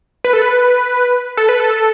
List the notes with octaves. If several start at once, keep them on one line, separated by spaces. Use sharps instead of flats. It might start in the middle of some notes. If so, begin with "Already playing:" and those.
B4
A4
B4
A4
B4
A4